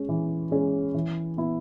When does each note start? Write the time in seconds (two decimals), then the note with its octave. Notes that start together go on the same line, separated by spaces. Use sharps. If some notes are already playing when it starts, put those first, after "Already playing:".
Already playing: G#3 C#4
0.09 E3
0.51 G#3 C#4 G#4
0.94 E3
1.37 B3 E4